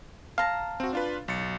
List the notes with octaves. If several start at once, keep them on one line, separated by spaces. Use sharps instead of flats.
F5 A5 A#5
C4 F#4
D4 F4 B4
B1 A6 C#7